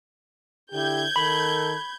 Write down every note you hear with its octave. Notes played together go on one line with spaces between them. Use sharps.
D3 E4 G4 G6 G#6
D#3 A4 A#4 B5